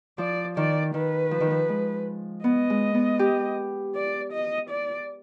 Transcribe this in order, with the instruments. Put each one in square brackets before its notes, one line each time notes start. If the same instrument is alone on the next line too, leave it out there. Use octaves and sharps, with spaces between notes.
[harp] F3 [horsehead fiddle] D5
[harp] D#3 [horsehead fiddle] D5
[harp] D#3 [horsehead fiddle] B4
[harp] F3
D#3
F3
G#3
[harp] B3 [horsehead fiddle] D#5
[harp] G#3
B3
G4
[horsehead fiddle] D5
D#5
D5